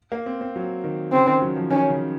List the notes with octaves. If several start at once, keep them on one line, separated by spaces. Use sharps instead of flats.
A#3
C4
C4
F#3
D#3
C#3 C4
D#3
F#3
F3
D#3 C#4
C#3